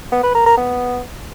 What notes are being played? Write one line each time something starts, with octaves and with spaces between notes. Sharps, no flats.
B3
B4
A#4
A#4
B3